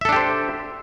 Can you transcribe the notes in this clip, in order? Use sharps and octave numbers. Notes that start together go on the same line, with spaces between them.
D4 G4 A4 C5 E5